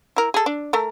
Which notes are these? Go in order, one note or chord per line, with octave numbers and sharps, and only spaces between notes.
E4 A#4
G#4 A4
D4
A3 A#4